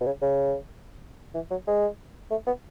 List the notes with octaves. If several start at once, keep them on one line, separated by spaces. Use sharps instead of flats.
B2
C#3
C#3
E3
F#3
G#3
A3
B3